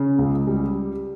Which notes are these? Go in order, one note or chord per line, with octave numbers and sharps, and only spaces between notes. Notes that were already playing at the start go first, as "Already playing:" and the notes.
Already playing: C#3
C#2
G3